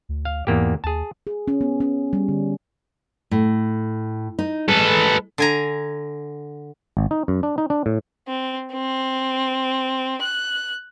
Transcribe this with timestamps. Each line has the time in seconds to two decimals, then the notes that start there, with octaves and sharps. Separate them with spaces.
0.09 D2
0.25 F5
0.47 E2 G#2 A#3 G4
0.84 D#2 G#4 A5
1.27 G#4
1.48 C#4
1.61 B3
1.80 C#4
2.13 G3
2.28 D3
3.31 A2
4.39 D#4
4.68 G#3 A4 B4
5.38 D3 G#5 A#5
6.97 G#1
7.11 D#4
7.28 F#2
7.43 D4
7.58 D#4
7.70 D4
7.86 A2
8.27 C4
8.73 C4
10.22 F#6